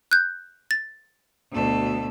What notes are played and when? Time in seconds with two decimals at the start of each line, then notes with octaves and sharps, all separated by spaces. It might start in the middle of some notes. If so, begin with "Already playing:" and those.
0.11 F#6 G6
0.71 A6
1.51 D2 B2 A4